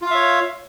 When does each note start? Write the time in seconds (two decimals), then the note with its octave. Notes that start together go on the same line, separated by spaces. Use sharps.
0.02 F4
0.06 F5
0.11 E5
0.15 C#5